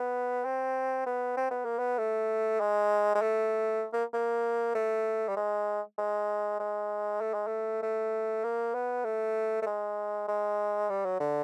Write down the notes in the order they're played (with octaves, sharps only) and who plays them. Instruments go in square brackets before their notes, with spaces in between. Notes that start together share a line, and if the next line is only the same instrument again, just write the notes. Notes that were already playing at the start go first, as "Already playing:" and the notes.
Already playing: [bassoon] B3
C4
B3
C4
B3
A#3
B3
A3
G#3
G#3
A3
A#3
A#3
A3
G3
G#3
G#3
G#3
A3
G#3
A3
A3
A#3
B3
A3
A3
G#3
G#3
G3
F#3
D3